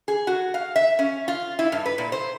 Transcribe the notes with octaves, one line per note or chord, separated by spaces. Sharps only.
G#4
F#4
F5
E5
C#4
F4
E4
G2
B4
A#2
C5